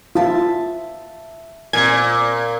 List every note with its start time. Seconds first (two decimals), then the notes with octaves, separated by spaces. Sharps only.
0.15 F4 E5 A5
1.73 A#2 C4 D5 G#5 G#6